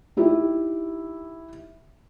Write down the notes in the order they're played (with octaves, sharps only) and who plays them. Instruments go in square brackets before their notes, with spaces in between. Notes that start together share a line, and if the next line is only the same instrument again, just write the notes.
[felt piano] D#4 E4 G4